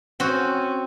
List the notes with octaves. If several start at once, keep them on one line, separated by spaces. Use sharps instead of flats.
C4 C#4 F#4